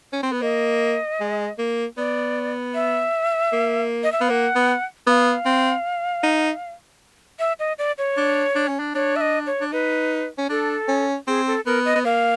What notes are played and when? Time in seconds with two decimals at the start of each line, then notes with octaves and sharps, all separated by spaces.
0.13 C#4
0.23 C4
0.32 B3
0.42 A#3 D#5
1.20 G#3
1.58 A#3
1.97 B3 D5
2.75 E5
3.53 A#3
4.04 D#5
4.12 E5
4.21 B3 F5
4.30 A#3 F#5
4.55 B3
5.07 B3 F5
5.45 C4
6.23 D#4
7.39 E5
7.59 D#5
7.78 D5
7.98 C#5
8.17 D4
8.56 D4
8.68 C#4
8.79 D4
8.95 D4 C#5
9.16 E5
9.21 D#5
9.47 C#5
9.61 D4
9.72 D#4 B4
10.38 C#4
10.49 D4 A4
10.88 C#4
11.27 C4 G#4
11.47 A4
11.66 B3 A#4
11.85 D#5
11.95 B3
12.05 A#3 F5